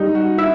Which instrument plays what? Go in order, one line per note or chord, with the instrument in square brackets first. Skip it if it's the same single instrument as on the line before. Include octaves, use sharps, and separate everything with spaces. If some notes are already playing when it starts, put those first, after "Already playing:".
Already playing: [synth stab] G3 [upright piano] D#4
[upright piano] F#4
[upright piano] E4 [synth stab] E5